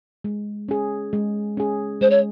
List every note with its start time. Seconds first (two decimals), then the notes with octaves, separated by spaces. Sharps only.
0.24 G#3
0.69 C#4 G#4
1.13 G#3
1.57 C#4 G#4
2.01 G#3 C5
2.10 C#5